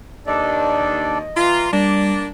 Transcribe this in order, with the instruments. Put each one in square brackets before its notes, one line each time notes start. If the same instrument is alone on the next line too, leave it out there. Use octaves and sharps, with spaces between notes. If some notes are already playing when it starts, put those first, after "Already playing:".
[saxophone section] D#2 [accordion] D4 A4 D5 [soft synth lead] D#5
[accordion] E3 A#5 [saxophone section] F4
[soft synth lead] G3 [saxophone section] A#3 D4 [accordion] D5